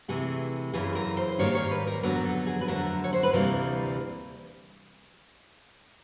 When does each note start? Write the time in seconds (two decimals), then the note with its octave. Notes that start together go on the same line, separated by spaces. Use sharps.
0.08 C3 E3 A3 G#4
0.73 F#2 C#3 E3 G#4
0.95 A#4
1.17 C5
1.39 G#2 D#3 G3 A#3 C#5
1.55 C#5
1.71 B4
1.87 A#4
2.03 F2 D3 F#3 B3 A#4
2.25 A4
2.47 G#4
2.61 B4
2.68 F2 D3 F#3 A3 A#4
3.04 C#5
3.13 C5
3.23 B4
3.33 D2 C3 E3 G3 A#3 A#4